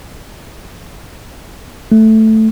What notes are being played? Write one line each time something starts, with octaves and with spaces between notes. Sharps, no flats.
A3